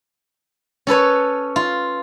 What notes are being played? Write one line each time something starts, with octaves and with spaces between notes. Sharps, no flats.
C#4 A4 B4 C#5
F4